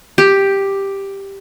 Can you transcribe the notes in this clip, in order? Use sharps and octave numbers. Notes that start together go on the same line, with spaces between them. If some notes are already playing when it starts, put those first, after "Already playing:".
G4